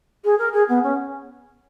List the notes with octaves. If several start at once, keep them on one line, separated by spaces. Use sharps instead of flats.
G#4
A#4
G#4
B3
C#4